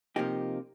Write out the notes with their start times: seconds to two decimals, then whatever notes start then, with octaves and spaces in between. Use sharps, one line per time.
0.16 C3 F3 A#3 D#4 G4